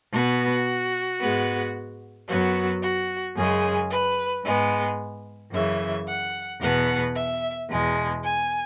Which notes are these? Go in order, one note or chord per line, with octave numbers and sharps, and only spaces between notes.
B2 B3 F#4
G#2 G#3 B3
F#2 F#3 B3 F#4
F#4
F#2 C#3 G#3 G#4
B4
G#2 G#3 B3
F#2 C#3 E3 E5
F#5
E2 B2 B3 F#5
E5
E2 B2 G#3
G#5